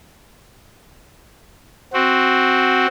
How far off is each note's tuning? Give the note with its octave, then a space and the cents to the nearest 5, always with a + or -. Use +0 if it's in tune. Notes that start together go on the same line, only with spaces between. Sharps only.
C4 +0 F#4 +0